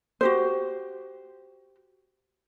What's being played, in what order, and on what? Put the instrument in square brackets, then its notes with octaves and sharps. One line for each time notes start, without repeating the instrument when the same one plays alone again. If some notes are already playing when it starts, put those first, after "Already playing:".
[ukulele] F#4 G4 C5